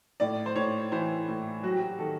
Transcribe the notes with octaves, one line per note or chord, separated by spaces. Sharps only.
A2 D5
C5
A2 C#5
E3 C5
A2
F#3 F#4
G4
F#4
D#3 A4